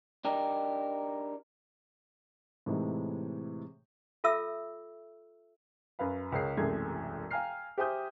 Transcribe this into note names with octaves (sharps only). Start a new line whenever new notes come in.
D4 D#4 G4 A#4
A2 C3 E3 G#3 D#4
F4 A4 E5 E6
F#2 B4 F5 B5
C#2 G#4 A#4 C#5 C7
E1 C2 F#2 G#3 A3 G#6
F5 G5 G#5 A#5 F6 C7
G4 C5 E5 G#5 D#6 G6